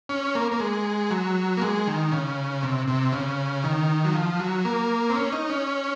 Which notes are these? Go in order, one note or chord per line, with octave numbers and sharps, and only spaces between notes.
C#4
A#3
A#3
G#3
F#3
A#3
G#3
D#3
C#3
C3
C3
C#3
D#3
F#3
F3
F#3
A#3
C4
C#4
D#4
C#4